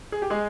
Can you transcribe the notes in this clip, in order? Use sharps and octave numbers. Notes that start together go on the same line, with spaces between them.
G#4
G4
G#3 G#4